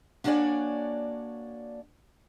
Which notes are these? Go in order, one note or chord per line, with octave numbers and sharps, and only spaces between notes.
A#3 D4 F#4 C#5 D5 G#5